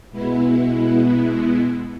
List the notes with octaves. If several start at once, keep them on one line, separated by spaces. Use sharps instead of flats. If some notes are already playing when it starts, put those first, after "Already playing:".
B2 G#3 B3 E4